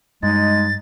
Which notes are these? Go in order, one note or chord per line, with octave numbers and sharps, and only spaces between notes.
G2 G#3 D#4 A6